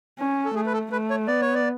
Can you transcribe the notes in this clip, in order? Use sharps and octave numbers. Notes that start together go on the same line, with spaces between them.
C#4
A4
A3 G#4
B4
A4
A3 B4
C#5
B3 D5
C#5
D5